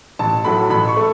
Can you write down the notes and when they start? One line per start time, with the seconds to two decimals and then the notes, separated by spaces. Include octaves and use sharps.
0.19 A1 A5
0.44 A2 F#3 A3 B5
0.70 A1 B5
0.88 C#6
0.97 A3